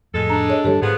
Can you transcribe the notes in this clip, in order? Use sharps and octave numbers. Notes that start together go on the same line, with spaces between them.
F2 A2 G#3 A4
D4 A#5
G#4 C#5 D#5
G2 D3 G3 G4 A4 C#5
G#2 F3 B3 G#4